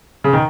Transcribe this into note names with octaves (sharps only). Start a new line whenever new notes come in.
C#3
D#3